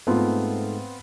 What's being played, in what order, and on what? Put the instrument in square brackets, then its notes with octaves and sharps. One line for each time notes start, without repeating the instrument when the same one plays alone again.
[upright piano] G#2 A3 [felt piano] B3 C4 F4